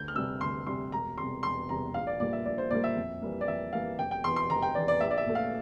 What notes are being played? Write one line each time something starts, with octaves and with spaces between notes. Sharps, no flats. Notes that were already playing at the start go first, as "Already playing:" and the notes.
Already playing: D2 G6
F6
C3 G3 E6
D2 C6
C3 G3 C6
E1 A#5
E2 C3 G3 C6
E1 C6
E2 C3 G3 A#5
A#1 F5
D5
A#2 G3 A#3 D5
E5
A#1 D5
C5
A#2 G3 A#3 D5
E5
F2
E3 G3 A#3
D5
F2 E5
E3 G3 A#3 F5
F1 G5
G5
E2 E3 C6
C6
F1 A#5
G5
E2 E3 D5
D5
A#1 E5
D5
E5
A#2 A3
F5